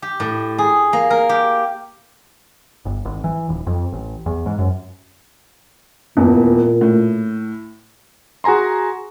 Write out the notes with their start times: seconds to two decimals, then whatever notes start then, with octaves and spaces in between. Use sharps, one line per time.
0.02 G4
0.20 A2
0.58 G#4
0.93 A#3
1.10 A#4
1.29 G4
2.85 G1
3.05 G#1
3.24 E3
3.49 D#1
3.67 F2
3.92 A1
4.26 E2
4.46 G#2
4.59 F#2
6.17 D#1 E2 A#2
6.81 A2
8.44 F#4 G#4 G#5 A#5 C6